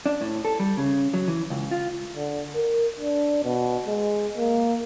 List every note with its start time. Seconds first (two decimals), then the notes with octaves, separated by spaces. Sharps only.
0.06 D4
0.21 A2
0.45 A4
0.59 G3
0.77 C#3
1.14 F#3
1.28 E3
1.50 C#2
1.71 F4
2.16 D3
2.55 A#4
3.00 D4
3.44 B2
3.86 G#3
4.37 A#3